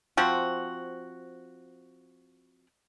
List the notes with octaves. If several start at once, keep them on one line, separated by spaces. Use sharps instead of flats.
F3 C4 F#4